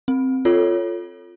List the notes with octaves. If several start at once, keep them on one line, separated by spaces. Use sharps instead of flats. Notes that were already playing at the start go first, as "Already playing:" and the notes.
C4
F4 A4 C#5